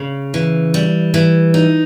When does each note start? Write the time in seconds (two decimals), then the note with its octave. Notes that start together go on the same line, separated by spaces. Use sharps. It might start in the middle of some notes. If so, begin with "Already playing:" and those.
Already playing: C#3
0.34 E3
0.74 G3
1.14 E3
1.54 D#4